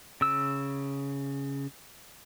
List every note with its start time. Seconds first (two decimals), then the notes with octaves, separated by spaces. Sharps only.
0.21 C#3 E6